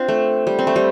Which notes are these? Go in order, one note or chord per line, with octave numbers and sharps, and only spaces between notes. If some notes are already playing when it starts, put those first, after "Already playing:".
Already playing: C4 D4 F4
A3
G3
C4
A3
G3